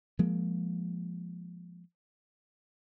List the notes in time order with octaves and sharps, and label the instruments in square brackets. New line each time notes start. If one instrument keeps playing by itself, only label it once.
[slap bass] F3 G#3 A#3